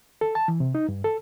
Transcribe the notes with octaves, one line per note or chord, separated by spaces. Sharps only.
A4
A5
E3
C3
D#4
G2
A4